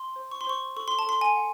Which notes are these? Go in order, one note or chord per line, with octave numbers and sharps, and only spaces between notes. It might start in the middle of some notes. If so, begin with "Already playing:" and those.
Already playing: C6
C5
C#6
C6
C5 C#6
A4 C#6
C6
A5
A4 C6
G#5
F#5